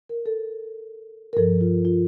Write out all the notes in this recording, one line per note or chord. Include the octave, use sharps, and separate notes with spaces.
A#4
A4
A#4
G2 F3 A4
F4
F4